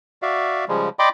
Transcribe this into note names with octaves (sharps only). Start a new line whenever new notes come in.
F#4 D5 E5 F5
C#3 F3 G3 G#3
D5 D#5 G5 B5 C6 D6